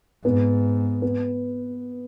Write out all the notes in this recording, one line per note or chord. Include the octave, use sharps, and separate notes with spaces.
G#2 B3
B3